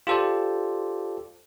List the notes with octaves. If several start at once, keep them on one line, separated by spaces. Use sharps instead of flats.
F4 G4 A4 C5 D5